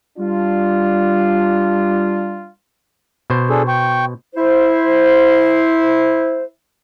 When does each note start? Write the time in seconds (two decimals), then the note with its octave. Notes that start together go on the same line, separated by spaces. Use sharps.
0.18 G3 D4 F4
3.30 B2 C5
3.50 D4 G#4 A4
3.68 G5 C#6
4.36 E4 C5